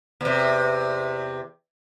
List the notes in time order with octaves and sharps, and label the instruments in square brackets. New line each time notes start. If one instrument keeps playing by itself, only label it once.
[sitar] E2 C3